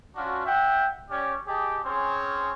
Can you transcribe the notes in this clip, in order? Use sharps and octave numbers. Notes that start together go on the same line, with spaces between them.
C#4 D4 F4 F#4
E5 F#5 G5
C#4 G4 C#5 D5
G4 G#4 D#5 G5 A5
C4 C#4 G#4 C5 C#5